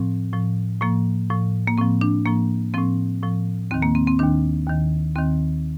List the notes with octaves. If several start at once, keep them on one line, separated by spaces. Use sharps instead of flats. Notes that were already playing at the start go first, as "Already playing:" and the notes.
Already playing: A2 F3 C4
A2 F3
A2 F3 A#3
A2 F3
A#3
A2 F3 C4
D4
A2 F3 A#3
A2 F3 C4
A2 F3
D#2 D#3 C4
A#3
C4
C4
D#2 D#3 D4
D#2 D#3
D#2 D#3 C4